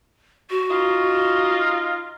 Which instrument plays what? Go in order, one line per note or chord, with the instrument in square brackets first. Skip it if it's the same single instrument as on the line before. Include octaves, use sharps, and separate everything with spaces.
[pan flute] F#4
[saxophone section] D#4 F4